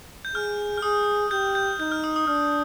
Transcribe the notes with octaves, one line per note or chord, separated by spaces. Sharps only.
G6
G#4 F6
F6
G#4 D#6
G4 G6
G6
D#4 G6
F6
D#6
D#6
D4 F6